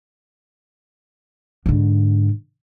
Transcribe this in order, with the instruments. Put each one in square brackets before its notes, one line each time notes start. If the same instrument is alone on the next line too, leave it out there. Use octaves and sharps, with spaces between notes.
[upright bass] G#2 D3